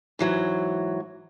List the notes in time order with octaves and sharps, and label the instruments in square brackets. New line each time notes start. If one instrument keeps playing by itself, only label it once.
[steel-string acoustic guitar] G#2 E3 F#3